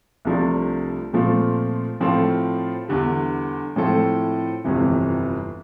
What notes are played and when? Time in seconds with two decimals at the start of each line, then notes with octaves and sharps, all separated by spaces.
0.25 C2 C3 F3 A3 D4
1.13 A#2 F3 A3 C4 F4
2.00 A2 F3 C4 F4 A4
2.88 E2 D3 G3
3.76 A2 F3 C4 E4 A4
4.64 G1 F2 C3 E3